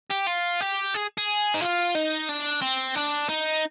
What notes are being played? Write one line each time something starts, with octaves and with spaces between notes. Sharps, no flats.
G4
F4
G4
G#4
G#4
D#4
F4
D#4
D4
C4
D4
D#4